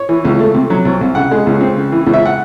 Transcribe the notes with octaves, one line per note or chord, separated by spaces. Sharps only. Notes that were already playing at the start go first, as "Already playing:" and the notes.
Already playing: C#5
E3
C#2
A3
C3
F#3
C2
C2
C#3 F#5
G#3
C#2
C4
C#3
E3
C#2
E5
F#5